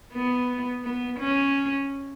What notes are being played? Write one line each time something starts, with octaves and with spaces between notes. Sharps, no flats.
B3
B3
C#4